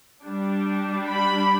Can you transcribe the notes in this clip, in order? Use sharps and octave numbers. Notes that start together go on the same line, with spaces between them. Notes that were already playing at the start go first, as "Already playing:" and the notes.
G3 D4
B5